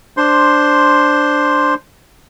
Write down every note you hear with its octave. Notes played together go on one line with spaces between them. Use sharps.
D4 C5 C6